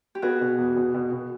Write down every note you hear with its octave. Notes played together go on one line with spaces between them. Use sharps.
G4
B3 F#4 G#4
B2
E2
B2
B2
B2